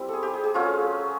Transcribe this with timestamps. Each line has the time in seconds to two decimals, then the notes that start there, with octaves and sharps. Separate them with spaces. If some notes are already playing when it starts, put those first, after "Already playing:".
Already playing: G3 C4 E4
0.08 G#4 A4
0.23 G4
0.33 G#4
0.44 G#4
0.54 F#3 A3 C#4 F4